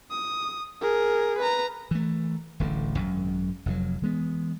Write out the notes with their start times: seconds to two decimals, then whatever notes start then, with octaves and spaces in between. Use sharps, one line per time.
0.11 D#6
0.81 G#4 A#4
1.39 B4 A#5
1.91 E3 A3
2.60 D1 A1 A2 D3
2.98 G#1 F#2
3.66 F1 F2 C3 F#3
4.02 E3 G#3 B3